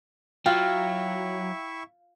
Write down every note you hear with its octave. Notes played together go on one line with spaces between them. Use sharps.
F#3 E4 F4 E5 G5 C#6